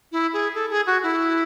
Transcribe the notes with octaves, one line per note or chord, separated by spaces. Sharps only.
E4
G#4
A4
G#4
F#4
E4